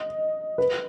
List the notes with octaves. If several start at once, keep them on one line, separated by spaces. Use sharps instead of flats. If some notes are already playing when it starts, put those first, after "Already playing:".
Already playing: D#5
B4